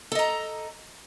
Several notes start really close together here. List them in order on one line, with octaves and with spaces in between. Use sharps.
A4 D#5 A#5